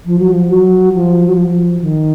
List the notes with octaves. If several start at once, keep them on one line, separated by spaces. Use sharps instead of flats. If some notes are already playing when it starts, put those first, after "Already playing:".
F3
F#3
F3
F#3
F3
F#3
F3
D#3